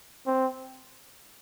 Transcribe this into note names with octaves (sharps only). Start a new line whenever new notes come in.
C4